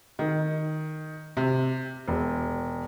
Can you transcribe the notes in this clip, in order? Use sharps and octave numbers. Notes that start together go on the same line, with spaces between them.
D#3
C3
E1